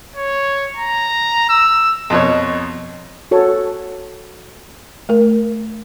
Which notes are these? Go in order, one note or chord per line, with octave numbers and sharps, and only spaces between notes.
C#5
A#5
E6
F2 B2 C#5
F#4 A4 C#5
A3 A#4